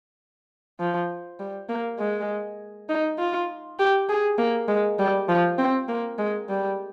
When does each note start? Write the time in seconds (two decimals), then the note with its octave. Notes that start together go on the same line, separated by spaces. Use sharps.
0.79 F3
1.40 G3
1.69 A#3
1.99 G#3
2.89 D#4
3.19 F4
3.79 G4
4.09 G#4
4.38 A#3
4.68 G#3
4.99 G3
5.29 F3
5.58 C4
5.88 A#3
6.18 G#3
6.49 G3